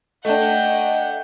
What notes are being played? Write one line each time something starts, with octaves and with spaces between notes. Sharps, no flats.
A3 D4 D#5 F#5 G5